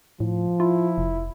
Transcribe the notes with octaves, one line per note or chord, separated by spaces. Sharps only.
A2 F3
E4 F4
F1